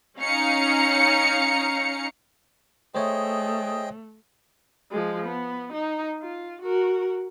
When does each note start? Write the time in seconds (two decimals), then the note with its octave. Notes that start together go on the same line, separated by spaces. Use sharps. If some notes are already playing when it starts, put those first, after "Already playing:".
0.18 C#4 D#4 F5 A#5 C#7
2.95 A3 G#4 C5 C#5 D#5 E5 G5
4.91 F3 G#3
5.26 B3
5.73 D#4
6.22 F4
6.62 F#4 A#4